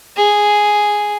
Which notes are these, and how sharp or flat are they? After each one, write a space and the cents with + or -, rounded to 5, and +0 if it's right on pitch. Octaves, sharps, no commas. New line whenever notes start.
G#4 +0